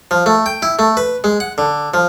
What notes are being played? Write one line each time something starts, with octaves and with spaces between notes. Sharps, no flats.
F3
A3
G5
E4
A3
B4
G#3
F#5
D3
F3